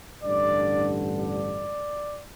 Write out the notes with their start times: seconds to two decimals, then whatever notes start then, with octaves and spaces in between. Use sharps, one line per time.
0.24 A1 G2 D3 D5
1.21 D5